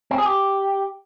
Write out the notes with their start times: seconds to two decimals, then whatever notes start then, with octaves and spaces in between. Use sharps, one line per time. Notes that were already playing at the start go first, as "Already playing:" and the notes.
0.11 C4
0.18 G#4
0.26 G4